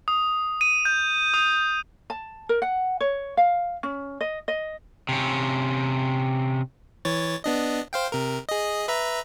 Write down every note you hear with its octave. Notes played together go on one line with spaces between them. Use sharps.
D#6
D#7
G6
D#6
A5
A#4
F#5
C#5
F5
C#4
D#5
D#5
C3 C#4
E3 C#5 A6
B3 D4 D#5
C5 F5 G5
C3 A#4
G#4 D#5
B4 E5 A#5